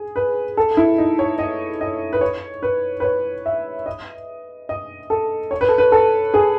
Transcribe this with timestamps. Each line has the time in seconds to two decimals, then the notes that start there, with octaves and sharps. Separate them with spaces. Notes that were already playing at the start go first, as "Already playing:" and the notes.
Already playing: G#4
0.16 B4
0.57 A4
0.77 E4
0.98 D#4
1.19 C#5
1.39 D#5
1.81 D#5
2.13 B4
2.21 C#5
2.63 B4
3.00 B4
3.04 C#5
3.46 E5
3.86 D#5
4.69 D#5
5.10 A4
5.51 C#5
5.61 B4
5.69 A4
5.78 B4
5.92 A4
6.34 G#4